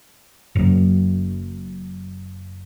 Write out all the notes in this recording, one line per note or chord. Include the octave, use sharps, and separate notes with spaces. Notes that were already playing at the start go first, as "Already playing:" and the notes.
F#1 F#2